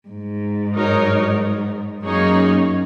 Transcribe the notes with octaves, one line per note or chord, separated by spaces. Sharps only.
G#2
F#3 D#4 A#4 C#5
F#2 A#3 D#4 G#4 C#5